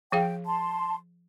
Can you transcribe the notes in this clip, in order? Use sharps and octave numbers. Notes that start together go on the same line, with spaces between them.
F3 G#4 F5 G5
A5 C6